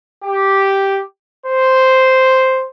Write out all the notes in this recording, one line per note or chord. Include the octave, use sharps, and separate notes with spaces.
G4
C5